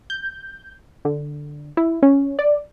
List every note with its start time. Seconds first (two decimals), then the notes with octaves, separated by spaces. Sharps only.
0.10 G6
1.05 D3
1.77 E4
2.02 C#4
2.39 D5